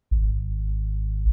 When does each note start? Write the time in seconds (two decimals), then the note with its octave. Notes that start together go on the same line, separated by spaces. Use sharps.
0.11 G#1